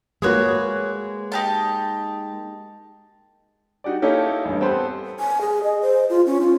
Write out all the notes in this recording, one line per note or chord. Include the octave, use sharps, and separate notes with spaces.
G#3 A#3 F#4 B4 C#5 D#6
D#4 G4 A5
D#4 F#4 G4 D5
A#3 C#4 D#4 E4 G4 A4
A1 G2
B3 C4 G4 A4 B4 C5
G#5
G#4
D#5
C5
F4
C#4
F4